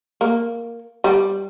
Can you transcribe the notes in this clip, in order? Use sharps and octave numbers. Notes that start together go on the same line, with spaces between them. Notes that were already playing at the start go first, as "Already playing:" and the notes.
A#3
G3